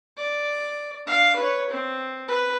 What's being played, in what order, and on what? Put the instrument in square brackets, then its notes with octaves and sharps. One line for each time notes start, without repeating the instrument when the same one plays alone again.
[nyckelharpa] D5
D4 F5
B4 C#5
C4
B4